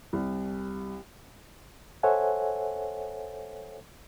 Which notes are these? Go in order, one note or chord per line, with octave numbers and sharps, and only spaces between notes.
C2
A4 C5 C#5 E5 F#5 G#5